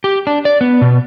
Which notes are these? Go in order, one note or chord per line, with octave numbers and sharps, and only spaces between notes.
G4
D4
D5
B3
B2